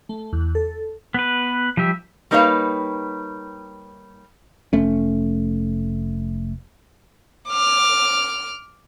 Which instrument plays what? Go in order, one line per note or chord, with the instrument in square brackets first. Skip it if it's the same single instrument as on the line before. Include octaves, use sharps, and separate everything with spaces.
[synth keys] A3
E2
A4
[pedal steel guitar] B3 B4
F3 G3 G4 E5
[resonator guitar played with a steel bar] G3 A#3 D#4 B4 C#5 F5
[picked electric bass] F1 A3 C#4
[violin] D6 F6